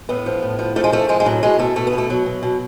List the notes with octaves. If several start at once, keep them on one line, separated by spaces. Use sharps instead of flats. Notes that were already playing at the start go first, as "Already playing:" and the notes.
A2 B3
F3
A2
F3
F3 A3
G#3
F3 A3
F3 G#3
G#3
A2 F#3
B2 G#3
B2 A3
B2 A3
B3
B2
A3
B2 F#3
B2
B2